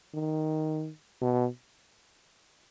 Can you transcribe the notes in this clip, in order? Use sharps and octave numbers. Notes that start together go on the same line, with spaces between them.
D#3
B2